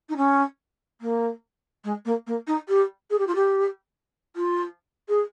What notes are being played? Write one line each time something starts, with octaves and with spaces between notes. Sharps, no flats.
D#4
C#4
A#3
G#3
A#3
A#3
D#4
G4
G#4
G4
F4
G4
F4
G#4